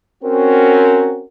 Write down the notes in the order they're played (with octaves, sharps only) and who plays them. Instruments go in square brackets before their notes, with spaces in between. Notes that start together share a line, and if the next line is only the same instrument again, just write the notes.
[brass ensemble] C4 C#4 F#4 A#4